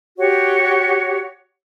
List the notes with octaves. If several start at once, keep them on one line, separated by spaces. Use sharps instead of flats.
F#4 G4 C#5